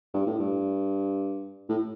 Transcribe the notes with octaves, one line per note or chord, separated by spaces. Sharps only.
G2
A2
G2
A2